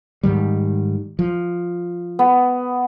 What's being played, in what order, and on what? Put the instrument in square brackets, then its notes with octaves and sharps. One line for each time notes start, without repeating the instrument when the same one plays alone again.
[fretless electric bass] G#2 D#3 G3
F3
[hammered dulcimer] B3